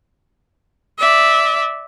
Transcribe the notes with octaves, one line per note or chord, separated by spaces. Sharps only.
D5 E5